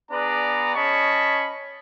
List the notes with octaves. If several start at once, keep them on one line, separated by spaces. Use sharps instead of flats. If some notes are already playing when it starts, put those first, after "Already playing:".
B3 D4 G#4 B4 D5 A#5
C#4 C#5 D#5 A5 B5 C#6